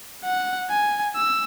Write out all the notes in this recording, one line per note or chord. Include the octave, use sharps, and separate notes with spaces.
F#5
G#5
E6